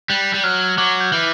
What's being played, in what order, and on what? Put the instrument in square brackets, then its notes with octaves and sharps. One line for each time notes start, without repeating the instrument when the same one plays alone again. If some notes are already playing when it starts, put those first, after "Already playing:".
[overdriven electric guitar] G3 [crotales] F#6
[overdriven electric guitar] G3
[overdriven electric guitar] F#3 [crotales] F6
[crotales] F#6
F6
[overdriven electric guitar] F#3 [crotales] D6
[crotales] G6
[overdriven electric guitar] E3